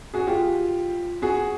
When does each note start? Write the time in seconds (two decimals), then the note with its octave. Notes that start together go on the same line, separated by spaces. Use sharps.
0.14 F#4 G#4
0.27 F4 G4
1.22 F#4 G#4